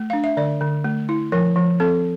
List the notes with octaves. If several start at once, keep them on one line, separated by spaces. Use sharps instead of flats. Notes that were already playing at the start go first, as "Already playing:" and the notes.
Already playing: A3
D4 F5
E5
D3 D5
D3
A3
E4
F3 A#4
F3
C4 A4